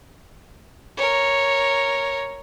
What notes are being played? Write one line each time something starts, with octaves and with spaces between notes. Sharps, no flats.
A#4 C#5